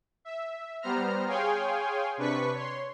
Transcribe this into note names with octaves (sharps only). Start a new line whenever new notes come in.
E5
G3 B3 C5 A#5 F6
G#4 C#5 F5 G5 G#5 C6
C3 D4 B4 C#6 B6
C#5 C6